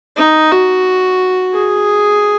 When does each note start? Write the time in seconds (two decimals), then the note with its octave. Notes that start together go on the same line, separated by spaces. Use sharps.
0.17 D#4
0.51 F#4
1.54 G#4